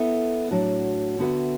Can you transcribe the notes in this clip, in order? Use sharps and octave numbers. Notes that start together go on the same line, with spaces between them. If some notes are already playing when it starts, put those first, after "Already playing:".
Already playing: B3 E4 A4 E5
A2 F#3 D4 F#4
D3 B3 F#4 B4 E5